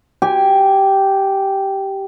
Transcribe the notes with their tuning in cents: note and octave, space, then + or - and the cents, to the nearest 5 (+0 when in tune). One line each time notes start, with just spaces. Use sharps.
G4 -10 G#5 -25